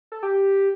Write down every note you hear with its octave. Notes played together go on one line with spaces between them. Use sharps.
A4
G4